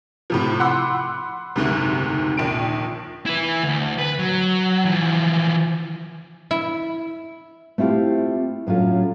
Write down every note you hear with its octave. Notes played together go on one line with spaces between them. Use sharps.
A2 C3 F3
F#5 B5 C6 D6 E6
F#1 D2 G#2 C3
A#1 D#2 D7
E4 B4
D2
B4
F#3
E3 F3
E4
A3 C4 E4 F4 G4
A2 F#3 C#4 F4 A4